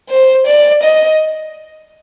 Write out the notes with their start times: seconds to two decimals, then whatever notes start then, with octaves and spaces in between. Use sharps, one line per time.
0.10 C5
0.47 D5
0.83 D#5